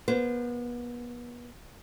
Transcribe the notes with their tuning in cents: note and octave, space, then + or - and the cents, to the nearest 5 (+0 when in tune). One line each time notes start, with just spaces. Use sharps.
B3 -35 C5 -35